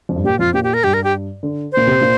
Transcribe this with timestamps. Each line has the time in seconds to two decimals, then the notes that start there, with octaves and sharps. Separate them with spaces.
0.09 F2
0.16 G2
0.24 A#2 G4
0.39 F2 F4
0.54 A#2 G4
0.64 G4
0.74 A#4
0.84 G2 G4
0.94 A#4
1.04 G4
1.43 D3
1.72 A#2 C5
1.87 C3
2.01 A#2